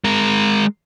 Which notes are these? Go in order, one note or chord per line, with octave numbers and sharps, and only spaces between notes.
G#3 A#4